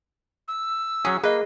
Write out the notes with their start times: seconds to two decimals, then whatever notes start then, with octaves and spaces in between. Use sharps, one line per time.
0.48 E6
1.05 F#3 C#4 G#4
1.24 A#3 G#4 B4 D#5